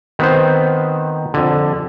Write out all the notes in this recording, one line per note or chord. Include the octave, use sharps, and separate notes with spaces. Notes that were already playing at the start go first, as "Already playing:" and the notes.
D#3 B3 C4 C5
F2 D3